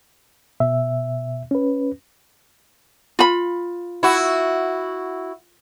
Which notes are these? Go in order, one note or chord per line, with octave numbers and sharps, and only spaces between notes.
B2 E5
C#4 B4
F4 B5
E4 F#4